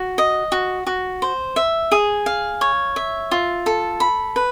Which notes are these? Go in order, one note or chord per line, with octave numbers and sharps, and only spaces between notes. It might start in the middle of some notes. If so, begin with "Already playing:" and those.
Already playing: F#4
D#5
F#4
F#4
C5
E5
G#4
F5
C#5
E5
F4
A4
B5
B4